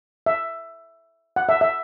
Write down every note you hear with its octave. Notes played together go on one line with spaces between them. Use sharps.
E5
F#5
E5
E5